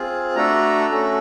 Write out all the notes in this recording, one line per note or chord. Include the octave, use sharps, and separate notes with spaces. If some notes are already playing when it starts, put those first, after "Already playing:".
Already playing: C4 F4 G#4
A3 D4 F#4 A4 A#5
A3 C#4 F#4 A4